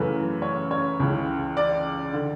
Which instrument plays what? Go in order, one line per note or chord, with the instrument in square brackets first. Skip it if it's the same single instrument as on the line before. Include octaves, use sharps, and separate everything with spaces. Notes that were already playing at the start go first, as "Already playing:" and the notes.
Already playing: [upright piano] F#2 C#3 E3 A3 B4
C#5
C#5
C#2 C#3 E3
D5
D3